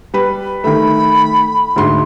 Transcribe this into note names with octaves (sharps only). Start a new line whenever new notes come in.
G3 B4
D#3 A3 B5
D2 G#2 C6